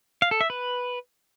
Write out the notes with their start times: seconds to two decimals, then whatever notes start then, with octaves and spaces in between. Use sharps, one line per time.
0.22 F5
0.31 A4
0.41 E5
0.50 B4